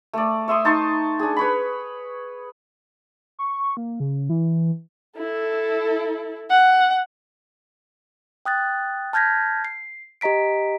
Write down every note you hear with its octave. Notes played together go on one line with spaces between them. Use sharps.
A3 D5
C#5 E5 C6 D#6
D#4 A5 C6 C#6
D4 G#4
B4 C#5 B5
C#6
A#3
C#3
E3
E4 A4
F#5
G5 D#6 F#6 A6
A5 F6 G6 G#6 A#6 B6
C7
G4 D#5 A#5 B6 D7